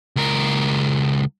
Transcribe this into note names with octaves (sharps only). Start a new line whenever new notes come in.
C#2 A#4